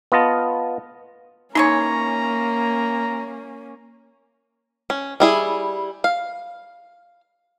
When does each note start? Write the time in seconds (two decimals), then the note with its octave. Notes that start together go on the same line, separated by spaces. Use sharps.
0.12 B3 F4 D#5 A5
1.55 E3 G#3 A#3 C#4 D#4 C#5 A#5
4.90 C#4
5.20 G3 E4 G#4
6.04 F5